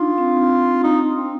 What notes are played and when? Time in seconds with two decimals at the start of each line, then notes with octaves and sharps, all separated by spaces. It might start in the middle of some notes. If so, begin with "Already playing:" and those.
Already playing: D4 D#4 F4
0.18 C4
0.84 D#4
1.16 C4